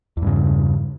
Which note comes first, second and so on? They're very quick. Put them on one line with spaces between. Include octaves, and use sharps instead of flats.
E2 G2 C#3